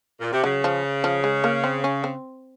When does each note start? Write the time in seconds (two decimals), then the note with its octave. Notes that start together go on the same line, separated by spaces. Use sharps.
0.21 A#2
0.32 C3
0.44 C#3 F#3
0.64 F3
1.04 F3
1.24 G#3
1.44 A#3
1.64 C4
1.84 C#4
2.04 C4